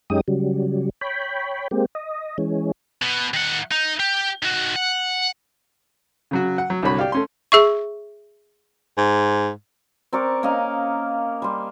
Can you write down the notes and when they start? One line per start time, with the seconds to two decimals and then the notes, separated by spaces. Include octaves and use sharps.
0.10 F#2 G#3 C#4 D#4 G4 D#6
0.28 C#3 F#3 G3
1.01 C#5 G5 B5
1.71 G#3 A#3 C4 G4
1.95 D#5
2.38 E3 G#3 C#4
3.02 B2
3.34 D#3 F#5
3.71 D#4
3.99 G4
4.42 D#3 F#4
4.76 F#5
6.31 C#3 F#3 F#4
6.58 F#5
6.70 F#3
6.83 C2 D3 F#4 C#5 B5 C#6
6.98 G4 D5 F5
7.12 A3 C#4 C6
7.52 G#4 E5 C#6
8.98 G#2
10.12 C4 A#4 D5 C#6
10.43 A#3 C#4 D#5 F5
11.42 G3 C6